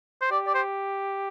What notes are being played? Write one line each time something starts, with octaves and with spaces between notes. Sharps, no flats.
C5
G4 D5
D5
C5